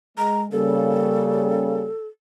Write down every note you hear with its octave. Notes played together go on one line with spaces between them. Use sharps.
G#3 A#5
C#3 G3 A#3 A4